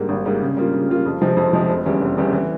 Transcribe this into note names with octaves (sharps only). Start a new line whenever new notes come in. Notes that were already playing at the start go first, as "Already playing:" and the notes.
Already playing: G#2 G3 A#3
G#1
G#2 G3 A#3
C#3
G3 A#3 F4
C#3
G3 A#3 F4
F2
C3 F3 G#3 C4
F2
C3 F3 G#3 C4
F1
E2 E3 G3 C#4
F1
E2 E3 G3 C#4
E3